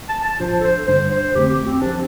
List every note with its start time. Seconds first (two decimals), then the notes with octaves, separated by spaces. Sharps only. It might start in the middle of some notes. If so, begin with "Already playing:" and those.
0.09 A5
0.25 A5
0.40 A1 A2 F3 D4 F4 C5
0.60 A4
0.64 C5
0.88 G2 D3 G3 D4 C5
1.11 C5
1.35 F2 D3 A3 C4 G4
1.50 G4
1.66 C4
1.81 F3 C4 D4 G4 C5